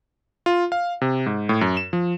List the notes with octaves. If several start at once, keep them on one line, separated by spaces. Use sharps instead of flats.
F4
F5
C3
G#2
A2
F#2
E7
F3